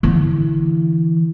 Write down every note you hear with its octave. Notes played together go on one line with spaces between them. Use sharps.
D3 E3